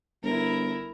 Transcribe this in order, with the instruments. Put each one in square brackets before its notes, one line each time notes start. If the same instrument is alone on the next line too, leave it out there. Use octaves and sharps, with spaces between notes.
[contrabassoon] G1 [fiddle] E4 A#4